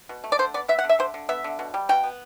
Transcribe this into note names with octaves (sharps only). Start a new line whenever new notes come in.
B2
A3
D5
D3 C5
B3 D5
B3 E5
F#5
D3
E5
D3 C5
D3
B3 E5
D3
B2
G3
B2 G5
B3